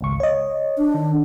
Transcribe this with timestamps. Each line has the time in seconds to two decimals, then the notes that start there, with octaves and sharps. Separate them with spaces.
0.01 G#1 C#2 C#6
0.20 C#5 D#5
0.78 D4
0.94 D#3